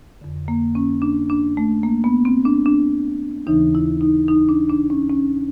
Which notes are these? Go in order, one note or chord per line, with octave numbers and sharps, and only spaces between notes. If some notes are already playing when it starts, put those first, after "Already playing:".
F2 D3
A#3
C#4
D4
D4
A3
A#3
B3
C4
D4
D4
D#2 C#3 E3 D#4
E4
D#4
D#4
D4
D4
C#4
C#4